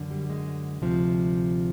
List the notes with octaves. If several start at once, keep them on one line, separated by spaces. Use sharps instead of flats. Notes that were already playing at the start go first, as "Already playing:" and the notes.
Already playing: F#2 D3
G3
G#3
D2 C3 F3